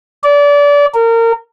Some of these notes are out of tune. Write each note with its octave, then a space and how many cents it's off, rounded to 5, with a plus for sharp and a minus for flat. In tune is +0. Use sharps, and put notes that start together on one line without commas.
D5 -30
A#4 -25